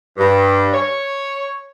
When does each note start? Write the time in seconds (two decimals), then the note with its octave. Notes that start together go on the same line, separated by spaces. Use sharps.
0.17 G2
0.73 C#5